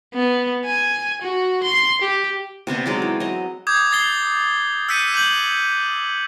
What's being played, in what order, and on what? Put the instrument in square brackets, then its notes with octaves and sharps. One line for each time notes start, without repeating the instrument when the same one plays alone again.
[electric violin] B3
G#5
F#4
C6
G4
[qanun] C3 B3 C4 D4
F#3 G#3 D#4 D5
E3
F#3 D#5
[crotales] D6 D#6 G6 G#6
D#6 G#6 A6 C7 G7
E6 F#6 G6 B6 C#7 D#7
D6 G6 F#7